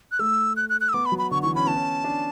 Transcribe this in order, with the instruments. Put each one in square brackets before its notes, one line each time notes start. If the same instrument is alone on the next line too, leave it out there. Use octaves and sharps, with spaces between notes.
[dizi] F#6
[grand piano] A3 [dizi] E6
[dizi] F#6
F#6
F#6
E6
[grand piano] B3 [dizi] D6
[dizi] B5
[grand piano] F#3
[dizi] B5
[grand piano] D3 [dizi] C#6
[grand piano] E3 [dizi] C#6
[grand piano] C#4 [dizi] B5
[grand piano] B3 [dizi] A5
[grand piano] C#4
D4